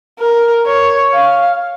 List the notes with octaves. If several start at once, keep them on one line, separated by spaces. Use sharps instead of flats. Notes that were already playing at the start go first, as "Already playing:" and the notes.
A#4
C#5
F5